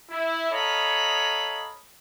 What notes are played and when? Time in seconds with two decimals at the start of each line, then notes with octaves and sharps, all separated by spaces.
0.10 E4
0.52 A4 C#5 D#5 F5 A#5 B5